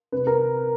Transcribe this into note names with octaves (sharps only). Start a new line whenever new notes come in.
C3 B4
A#4